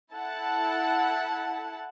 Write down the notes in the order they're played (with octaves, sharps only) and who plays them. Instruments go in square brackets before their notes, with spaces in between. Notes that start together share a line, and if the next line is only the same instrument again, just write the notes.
[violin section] E4 A4 F#5 A5